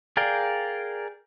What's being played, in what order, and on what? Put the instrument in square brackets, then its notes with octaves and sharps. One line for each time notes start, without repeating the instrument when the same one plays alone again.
[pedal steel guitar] G#4 A#4 D5 F5 G5